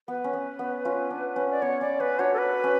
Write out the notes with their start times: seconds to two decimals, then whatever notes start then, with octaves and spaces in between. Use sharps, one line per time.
0.08 B3 B4
0.24 C#4
0.33 B3
0.59 B3
0.85 C#4 F4
1.10 D4
1.36 C#4
1.51 D5
1.62 B3 C#5
1.81 C#4 D5
2.00 C#4 B4
2.19 D4 F#4 C#5
2.34 A4
2.38 B4
2.64 C#4